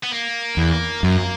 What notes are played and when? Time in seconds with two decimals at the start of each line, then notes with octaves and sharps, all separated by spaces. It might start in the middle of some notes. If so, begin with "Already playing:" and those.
0.03 B3
0.12 A#3
0.57 E2
1.03 F#2